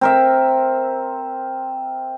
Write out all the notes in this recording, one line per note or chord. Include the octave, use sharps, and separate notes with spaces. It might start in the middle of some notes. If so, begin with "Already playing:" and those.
C4 A#4 E5